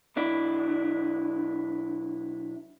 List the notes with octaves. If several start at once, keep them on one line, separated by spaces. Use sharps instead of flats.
B1 D4 E4